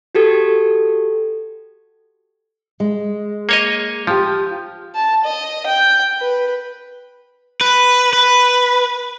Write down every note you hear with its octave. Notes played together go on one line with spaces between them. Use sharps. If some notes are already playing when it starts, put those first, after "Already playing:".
F#4 G4 A4 G#6
G#3
A#3 C#5 D#5
F3 F4 G4
A5
D#5
G5
B4
B4
B4